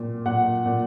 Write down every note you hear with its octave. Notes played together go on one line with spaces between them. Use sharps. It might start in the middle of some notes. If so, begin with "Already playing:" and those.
Already playing: A#2
A#2 F#5
A#2